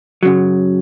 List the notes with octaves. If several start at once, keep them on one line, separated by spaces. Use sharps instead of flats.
F#2 C#3 F#3